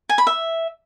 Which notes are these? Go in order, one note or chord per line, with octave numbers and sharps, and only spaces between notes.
G#5
B5
E5